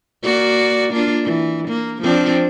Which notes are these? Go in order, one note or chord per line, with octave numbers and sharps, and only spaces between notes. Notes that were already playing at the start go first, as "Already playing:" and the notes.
A#3 F#4 D5
A#3 D4 F4
E3
A#3
F3 C4 D4